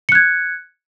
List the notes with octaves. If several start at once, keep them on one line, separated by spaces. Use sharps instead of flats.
F#6 G#6 C#7